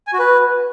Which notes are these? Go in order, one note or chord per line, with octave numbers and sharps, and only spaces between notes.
G#5
F#4
B4